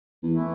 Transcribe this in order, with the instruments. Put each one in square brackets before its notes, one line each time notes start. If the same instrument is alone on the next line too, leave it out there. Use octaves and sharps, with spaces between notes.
[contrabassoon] E2
[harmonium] E3 A3 E4